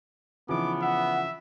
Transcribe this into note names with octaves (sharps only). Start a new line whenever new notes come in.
C#3 E3 F3 B3 D#4 D6
E5 F#5